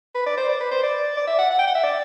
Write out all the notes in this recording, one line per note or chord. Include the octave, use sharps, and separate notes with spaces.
B4
D5
C5
D5
B4
C5
D5
D5
E5
F#5
F#5
G5
F#5
E5
D5